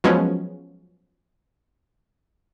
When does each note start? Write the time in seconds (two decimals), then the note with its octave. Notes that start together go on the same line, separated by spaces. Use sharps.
0.04 F3 F#3 G#3 B3 C#4